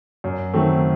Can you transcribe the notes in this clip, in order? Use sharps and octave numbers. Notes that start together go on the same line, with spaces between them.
F#2
D#3 F#3 A3 C4